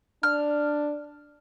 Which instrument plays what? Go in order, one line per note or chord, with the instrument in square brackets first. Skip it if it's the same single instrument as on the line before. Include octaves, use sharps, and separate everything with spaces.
[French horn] D4 [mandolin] F6